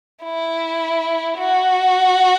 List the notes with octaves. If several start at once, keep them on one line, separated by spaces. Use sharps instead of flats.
E4
F#4